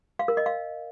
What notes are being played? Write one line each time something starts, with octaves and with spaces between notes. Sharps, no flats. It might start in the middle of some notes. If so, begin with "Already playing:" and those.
F5
A#4
D#5
F5